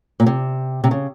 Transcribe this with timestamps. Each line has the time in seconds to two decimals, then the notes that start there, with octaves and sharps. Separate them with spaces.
0.20 A#2
0.26 C3
0.84 C3
0.91 C#3